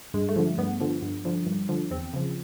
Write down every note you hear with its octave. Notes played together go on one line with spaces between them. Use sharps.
G2 G#3
A3
D3 F3
G2 B3
D3 F3
G2
D3 F3
G2
D3 F3
E2 C4
C#3 F3